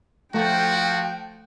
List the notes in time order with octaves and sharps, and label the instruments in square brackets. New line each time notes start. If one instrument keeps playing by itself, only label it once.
[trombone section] F3 [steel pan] A3 [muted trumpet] F#4 [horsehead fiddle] G5